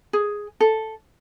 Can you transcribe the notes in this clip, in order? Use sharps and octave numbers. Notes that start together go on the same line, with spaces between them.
G#4
A4